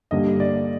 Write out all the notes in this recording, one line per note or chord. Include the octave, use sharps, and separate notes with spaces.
G2 D3 G3 A#3 D#5
D5